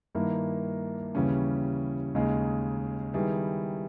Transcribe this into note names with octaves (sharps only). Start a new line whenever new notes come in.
G2 D#3 A#3 E4 A#4
D#2 C#3 E3 G3 C#4
D#2 C#3 G#3 D#4 G#4
D#3 G3 B3 E4 G#4